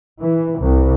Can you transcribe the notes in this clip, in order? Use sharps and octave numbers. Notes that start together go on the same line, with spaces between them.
E3
C2